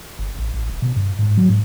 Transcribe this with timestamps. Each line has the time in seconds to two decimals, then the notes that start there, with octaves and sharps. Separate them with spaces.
0.19 G1
0.39 A1
0.54 A1
0.69 D1
0.82 B2
0.96 G2
1.19 G#2
1.37 F#3
1.49 G#2